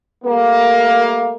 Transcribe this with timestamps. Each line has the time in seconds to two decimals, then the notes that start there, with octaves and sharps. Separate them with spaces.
0.24 G3 A3 A#3